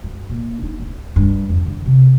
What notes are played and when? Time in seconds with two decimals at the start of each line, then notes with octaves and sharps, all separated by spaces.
0.04 F#2
0.29 A#2
0.63 D#4
0.80 D1
1.16 G2
1.49 F2
1.66 D3
1.86 C3